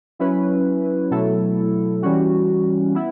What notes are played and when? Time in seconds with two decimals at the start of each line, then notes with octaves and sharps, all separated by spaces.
0.19 F#3 C#4 E4 B4
1.11 B2 F#3 A3 E4 A4
2.02 E3 G3 C#4 F#4
2.94 B3 E4